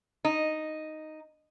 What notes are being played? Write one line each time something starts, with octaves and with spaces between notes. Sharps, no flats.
D#4